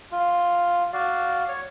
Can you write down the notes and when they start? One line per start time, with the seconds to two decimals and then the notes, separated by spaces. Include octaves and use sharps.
0.12 F4
0.93 F#4 D5 F5
1.48 C#5